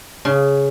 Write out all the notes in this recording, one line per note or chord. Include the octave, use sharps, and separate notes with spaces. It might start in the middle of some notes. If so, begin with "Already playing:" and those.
C#3